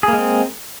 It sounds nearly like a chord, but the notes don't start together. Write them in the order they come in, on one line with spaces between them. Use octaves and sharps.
G#4 A#3 G#3 C4